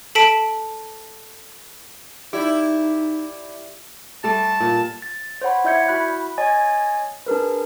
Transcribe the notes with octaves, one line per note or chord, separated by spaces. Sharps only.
A4 A5 B6 D7
D#4 E4 G4 D5 G6
G3 A3 A5
A#2
A6
C5 C#5 F#5 B5
E4 D5 E5 G6 G#6 C#7
E4 F#4 B5 F#6
C#5 D#5 G#5 A6
D4 G#4 A#4 B4